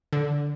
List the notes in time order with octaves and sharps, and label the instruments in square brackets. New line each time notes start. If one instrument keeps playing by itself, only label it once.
[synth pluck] D3